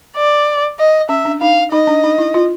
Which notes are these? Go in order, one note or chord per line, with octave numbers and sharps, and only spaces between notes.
D5
D#5
C#4 E5
D4
D#4 F5
D#4 D#5
D4
D#4
E4
F4